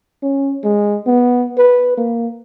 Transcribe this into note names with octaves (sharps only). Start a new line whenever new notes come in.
C#4
G#3
B3
B4
A#3